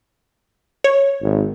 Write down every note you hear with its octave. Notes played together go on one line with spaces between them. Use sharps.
C#5
G#1